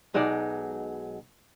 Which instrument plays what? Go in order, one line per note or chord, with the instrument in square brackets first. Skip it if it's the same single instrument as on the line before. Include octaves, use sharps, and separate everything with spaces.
[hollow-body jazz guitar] B1 F#3 G#3 D#4 D5